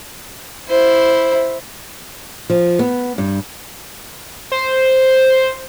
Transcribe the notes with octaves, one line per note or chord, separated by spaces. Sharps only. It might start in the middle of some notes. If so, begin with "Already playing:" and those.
E4 C5
F3
B3
G2
C5